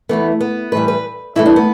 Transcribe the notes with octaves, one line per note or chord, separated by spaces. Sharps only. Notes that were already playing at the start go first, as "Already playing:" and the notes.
E2 E3 A3 B3
B3
A2 E3 G3 B4
B4
G2 E3 A3 E4
D4
B3